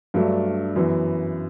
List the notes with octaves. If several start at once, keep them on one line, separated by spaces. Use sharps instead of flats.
G2 F#3 A3 D4
F#2 E3 B3